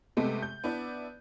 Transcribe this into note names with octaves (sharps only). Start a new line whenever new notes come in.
C3 G#3 A3 B3
G6
B3 D4 E4 D5